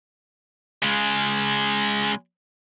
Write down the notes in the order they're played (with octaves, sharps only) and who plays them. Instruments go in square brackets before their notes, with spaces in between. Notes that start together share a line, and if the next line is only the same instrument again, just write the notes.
[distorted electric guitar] C#3 G#3